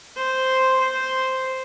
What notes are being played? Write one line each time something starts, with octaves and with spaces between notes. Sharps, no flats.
C5
C5